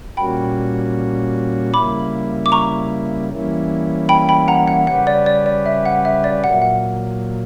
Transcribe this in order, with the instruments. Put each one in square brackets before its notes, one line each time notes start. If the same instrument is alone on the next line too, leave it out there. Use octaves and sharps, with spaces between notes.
[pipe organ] A#2 G3 A#3 C#4 F#4 [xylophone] G5 B5
[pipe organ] C#3 G3 A#3 E4 [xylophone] B5 D6
[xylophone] D6
A#5 C#6
[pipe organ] E3 G3 A#3 C#4 E4
[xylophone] G5 B5
G5 B5
F#5 A#5
F#5
[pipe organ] C#3 G3 C#4 G4 B4 [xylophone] F#5
[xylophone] D5
D5
D5
E5
F#5
E5
D5
[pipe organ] A#2 F#3 A#3 [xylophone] F#5
[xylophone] E5
F#5